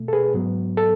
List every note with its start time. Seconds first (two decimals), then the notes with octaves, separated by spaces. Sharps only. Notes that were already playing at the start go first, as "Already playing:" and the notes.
Already playing: B2 A3
0.08 A4
0.13 G#4 B4
0.34 G#2 F#3 B3
0.77 A4